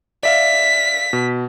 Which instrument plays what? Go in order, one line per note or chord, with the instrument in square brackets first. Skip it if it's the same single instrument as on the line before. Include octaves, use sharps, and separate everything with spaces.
[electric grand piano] D5 E5 F5 [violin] B6
[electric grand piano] B2